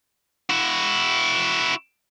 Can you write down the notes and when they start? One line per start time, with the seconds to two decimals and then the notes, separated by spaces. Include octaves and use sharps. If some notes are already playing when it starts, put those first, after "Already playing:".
0.50 E4 F#4